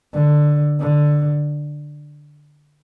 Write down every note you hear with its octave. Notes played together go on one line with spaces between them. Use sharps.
D3
D3